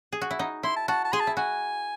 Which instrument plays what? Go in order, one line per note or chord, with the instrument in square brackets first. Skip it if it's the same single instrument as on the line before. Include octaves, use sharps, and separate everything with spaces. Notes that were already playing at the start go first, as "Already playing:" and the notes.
[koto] G#4
F#4
E4
[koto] D#4 [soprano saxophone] F#5
[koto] E4 [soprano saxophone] C6
[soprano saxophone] A5
[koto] F#4 [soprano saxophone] A5
[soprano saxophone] A5
[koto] G#4 [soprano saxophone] C6
[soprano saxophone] A5
[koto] E4
[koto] F#4 [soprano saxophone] G#5